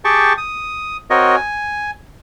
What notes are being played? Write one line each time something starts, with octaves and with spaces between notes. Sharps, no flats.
G4 G#4 G5 A5 C#6
D#6
C4 F#4 A#4 C#5 D#5
G#5